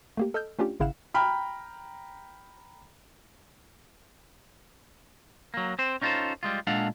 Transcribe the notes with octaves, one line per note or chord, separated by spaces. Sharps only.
A3 A#3 G4
A4 D#5 E6 F6 G6
A3 C#4 D4 F4 G4
G#1 C#3 E4 F5 F#5 E7
G5 A#5 B5 F6
F#3 A#3
C4 C5
C#4 D#4 F4 G4 A4 C5
G3 G#3 F4
A#2 G#3 D4 A4 F5 F#5